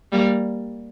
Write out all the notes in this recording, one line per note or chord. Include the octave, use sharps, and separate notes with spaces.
G3 A#3